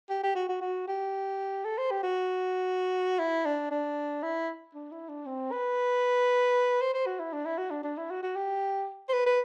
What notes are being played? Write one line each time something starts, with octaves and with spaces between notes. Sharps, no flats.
G4
G4
F#4
F#4
F#4
G4
A4
C5
G4
F#4
E4
D4
D4
E4
D4
E4
D4
C4
B4
C5
C5
F#4
E4
D4
E4
F#4
D4
D4
E4
F#4
F#4
G4
C5
B4
B4